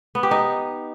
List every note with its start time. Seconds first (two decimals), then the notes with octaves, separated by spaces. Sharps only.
0.15 B3
0.23 G4
0.31 D#4